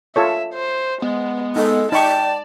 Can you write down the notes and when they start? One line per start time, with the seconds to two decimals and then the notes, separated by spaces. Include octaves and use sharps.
0.16 F4 A4 C#5 E5
0.54 C5
1.02 G#3 B3
1.56 G#3 D#4 A4
1.92 D#4 D5 G5 A5 C#6